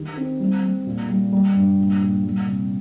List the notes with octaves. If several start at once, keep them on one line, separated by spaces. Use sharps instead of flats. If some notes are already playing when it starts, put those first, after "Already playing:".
Already playing: D#3 G4
C4
G3
G3
A#2
G3
G3
G2
A#2
A#2
G3
C3